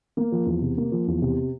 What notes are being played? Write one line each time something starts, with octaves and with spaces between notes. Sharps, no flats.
A#3
F3
E2
C3
A#3
F3
E2
C3